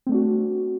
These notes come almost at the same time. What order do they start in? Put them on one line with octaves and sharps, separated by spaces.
C4 A3 D4 F#4